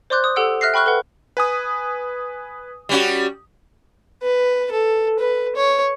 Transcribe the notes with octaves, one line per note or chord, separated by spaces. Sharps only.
C5 D5 C6 D6 F#6 G6
D#6
G4 A4 F#5 E6 D7
E5 F6 F#6 A#6 C7
G5 B5 C#6 F6 F#6
A4 B4 F#5
B4 G#5 D#6
G3 C#4 F#4
B4
A4
B4
C#5